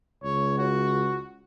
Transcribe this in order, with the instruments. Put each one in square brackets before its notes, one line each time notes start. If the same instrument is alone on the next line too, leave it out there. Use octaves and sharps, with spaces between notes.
[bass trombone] C#2 [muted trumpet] C#5
[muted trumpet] F#4